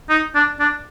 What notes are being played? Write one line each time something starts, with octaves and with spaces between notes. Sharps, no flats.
D#4
D4
D4